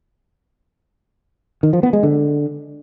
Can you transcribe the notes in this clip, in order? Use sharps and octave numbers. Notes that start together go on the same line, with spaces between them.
D#3
F3
B3
G#3
D3